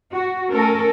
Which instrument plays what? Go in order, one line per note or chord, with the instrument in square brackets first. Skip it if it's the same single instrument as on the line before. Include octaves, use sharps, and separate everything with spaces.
[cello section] F#4
A3 C#4 A4 A#4